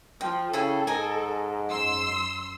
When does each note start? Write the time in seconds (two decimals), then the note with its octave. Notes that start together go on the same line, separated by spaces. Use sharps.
0.21 F3 G5
0.53 C#3 E4 G#4 A4 G5
0.87 G#2 A#4 D#5 G#5
1.70 F#2 C6 E6